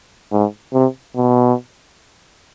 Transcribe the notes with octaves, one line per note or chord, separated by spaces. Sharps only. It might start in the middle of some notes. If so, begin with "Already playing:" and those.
G#2
C3
B2